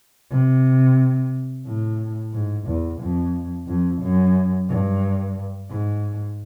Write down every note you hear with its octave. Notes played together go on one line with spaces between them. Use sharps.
C3
A2
G#2
E2
F2
F2
F#2
G2
G#2